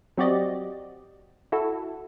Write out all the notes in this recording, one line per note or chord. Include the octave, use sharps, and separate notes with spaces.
F#3 C4 F#4 G4 D5 D#5
E4 F#4 A4